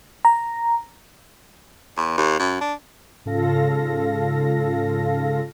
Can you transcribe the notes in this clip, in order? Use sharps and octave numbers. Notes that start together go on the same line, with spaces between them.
A#5
E2
D#2
F#2
D4
G#2 C#3 F4 A4 F5 A#6